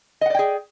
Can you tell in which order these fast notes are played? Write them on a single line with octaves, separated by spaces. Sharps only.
D#5 F#5 D5 G5 G#4